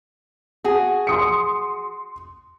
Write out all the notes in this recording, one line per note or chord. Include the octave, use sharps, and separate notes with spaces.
F#4 G#4
C6 D#6 C#7